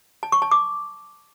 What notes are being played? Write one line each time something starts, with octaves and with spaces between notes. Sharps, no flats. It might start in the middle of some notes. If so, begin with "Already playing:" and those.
A5
C#6
A5
D6